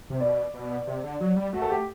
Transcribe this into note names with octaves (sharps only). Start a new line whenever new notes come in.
C3
B2 D5
B2
C3
D3
F#3
G3
A3 F#4
A4
G4